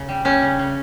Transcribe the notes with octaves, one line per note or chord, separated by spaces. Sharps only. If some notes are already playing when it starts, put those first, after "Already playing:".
Already playing: C#3
G3
G3 C#4
C#3
C#3